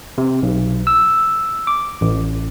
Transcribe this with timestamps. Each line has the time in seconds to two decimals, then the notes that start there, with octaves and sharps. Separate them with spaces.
0.18 C3
0.43 B1
0.87 E6
1.67 D6
2.01 A1